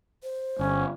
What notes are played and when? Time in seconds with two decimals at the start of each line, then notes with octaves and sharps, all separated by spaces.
0.23 C5
0.59 G1 C#4